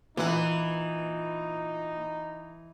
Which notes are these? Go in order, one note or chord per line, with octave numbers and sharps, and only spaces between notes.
A#2 E3 D#4 F#5